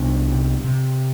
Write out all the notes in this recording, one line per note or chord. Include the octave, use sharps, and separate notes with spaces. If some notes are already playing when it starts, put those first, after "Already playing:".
Already playing: C2 B3 D4
C3
C3